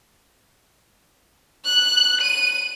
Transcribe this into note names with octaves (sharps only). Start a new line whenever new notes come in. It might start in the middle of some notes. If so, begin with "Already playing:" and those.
F#6
D#7